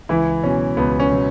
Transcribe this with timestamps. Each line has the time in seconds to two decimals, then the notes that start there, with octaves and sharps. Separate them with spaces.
0.09 C#2 E3 E4
0.43 B2 F#3 C#4
0.77 C#2 B3
1.00 C#4
1.11 B2 F#3